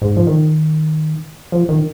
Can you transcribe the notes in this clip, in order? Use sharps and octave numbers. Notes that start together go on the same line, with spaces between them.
G#2
F3
D#3
F3
D#3